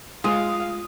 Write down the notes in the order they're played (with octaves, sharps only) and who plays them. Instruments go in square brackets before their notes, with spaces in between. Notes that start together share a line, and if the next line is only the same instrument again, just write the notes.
[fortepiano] G#3 [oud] F4 [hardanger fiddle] F5 [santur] D#6